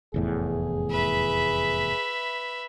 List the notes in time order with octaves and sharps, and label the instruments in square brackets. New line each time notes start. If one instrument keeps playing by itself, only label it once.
[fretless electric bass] F1 E2 A2 [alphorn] G#4
[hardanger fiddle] B4 E5